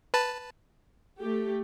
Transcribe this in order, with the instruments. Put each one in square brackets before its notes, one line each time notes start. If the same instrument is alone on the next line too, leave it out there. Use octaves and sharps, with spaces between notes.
[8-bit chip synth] B4 A5
[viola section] A3 G4